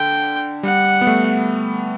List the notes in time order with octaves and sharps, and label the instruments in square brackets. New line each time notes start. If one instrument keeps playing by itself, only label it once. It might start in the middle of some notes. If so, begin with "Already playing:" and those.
Already playing: [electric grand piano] D3 [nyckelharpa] G5
[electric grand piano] G3 [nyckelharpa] F#5
[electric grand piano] B3
A3